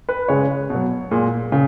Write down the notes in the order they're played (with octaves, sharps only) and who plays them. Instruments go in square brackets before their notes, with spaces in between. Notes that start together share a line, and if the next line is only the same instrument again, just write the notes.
[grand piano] B4
C#3 G#3 C#5
B2
F#3
A#2 G#3
C#3